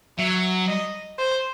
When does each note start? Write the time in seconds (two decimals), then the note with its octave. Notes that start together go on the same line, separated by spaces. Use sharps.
0.18 F#3 E5
0.68 D#5
1.19 C5